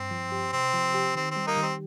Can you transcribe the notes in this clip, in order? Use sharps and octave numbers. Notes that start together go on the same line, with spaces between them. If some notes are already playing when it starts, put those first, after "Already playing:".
Already playing: G2 C4
F3
G4
C3 C4
F3
G4
D#3 C4
C4
G3
A#3 D#4
D#3
C4